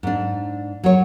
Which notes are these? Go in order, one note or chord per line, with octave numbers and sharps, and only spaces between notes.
G#2 D4
F#3 C#5